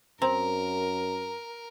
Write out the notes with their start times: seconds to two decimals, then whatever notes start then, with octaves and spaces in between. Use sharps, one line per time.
0.22 F#2 C4 A#4 A#5